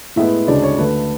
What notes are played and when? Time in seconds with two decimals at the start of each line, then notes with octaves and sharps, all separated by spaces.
0.16 A2 G#3 B3 E4 E5
0.47 D2 C#3 G#3 D4 D5
0.63 C#5
0.78 D2 D3 A3 B4